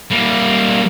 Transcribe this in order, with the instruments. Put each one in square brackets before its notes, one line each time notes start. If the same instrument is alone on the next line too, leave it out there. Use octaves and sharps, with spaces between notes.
[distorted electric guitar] G3 A#3